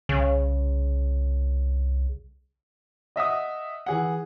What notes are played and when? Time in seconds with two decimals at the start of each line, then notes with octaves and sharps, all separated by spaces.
0.09 C2 C#3
3.16 D#5 E5 F#5 D#6
3.86 E3 G#4 F#5